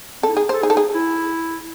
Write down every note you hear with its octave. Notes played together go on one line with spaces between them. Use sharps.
C4 A4
E4
D#4
G#4
A4 C5
D#4 G#4
A4
D#4
G#4
E4